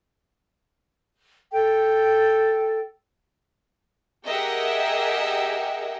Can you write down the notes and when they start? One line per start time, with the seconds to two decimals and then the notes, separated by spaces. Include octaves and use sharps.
1.52 A4 G5
4.25 G4 G#4 A#4 D#5 E5 F#5